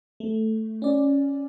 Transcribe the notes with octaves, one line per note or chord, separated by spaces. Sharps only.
A3
C#4 D5